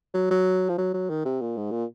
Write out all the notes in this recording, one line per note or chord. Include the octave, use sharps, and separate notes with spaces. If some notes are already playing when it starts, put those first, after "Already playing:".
F#3
F#3
F3
F#3
F#3
D#3
C3
A#2
G#2
A#2